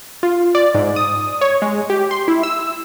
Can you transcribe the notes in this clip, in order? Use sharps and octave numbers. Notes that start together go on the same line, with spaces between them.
F4
D5
G#2
D#6
C#5
G#3
G4
C6
E4
E6